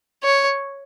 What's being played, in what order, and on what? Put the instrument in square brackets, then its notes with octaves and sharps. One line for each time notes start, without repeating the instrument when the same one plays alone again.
[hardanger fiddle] C#5